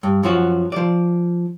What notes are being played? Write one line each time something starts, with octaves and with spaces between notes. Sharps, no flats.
G2
F#2 F3 F#4
F3 D5